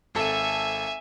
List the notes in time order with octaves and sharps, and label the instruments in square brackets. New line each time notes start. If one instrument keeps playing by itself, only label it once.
[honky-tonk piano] G#1 A4 [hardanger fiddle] E5 G#5